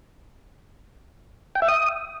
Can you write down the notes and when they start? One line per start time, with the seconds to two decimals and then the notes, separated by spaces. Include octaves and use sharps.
1.55 G5
1.62 E5
1.68 D#6